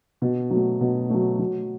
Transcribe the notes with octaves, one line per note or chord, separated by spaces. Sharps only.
B2
F#3 A3
B2
F#3 A3
F#3